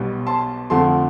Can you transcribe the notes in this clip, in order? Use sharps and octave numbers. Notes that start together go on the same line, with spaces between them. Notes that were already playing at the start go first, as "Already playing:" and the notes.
Already playing: B1 B2 G3
A5 C6
F2 D3 F3 A3 A5 C6